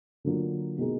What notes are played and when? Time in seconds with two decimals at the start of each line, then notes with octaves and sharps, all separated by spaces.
0.25 D3 F#3 A#3 D4 F4
0.78 B2 A#3 D#4 G#4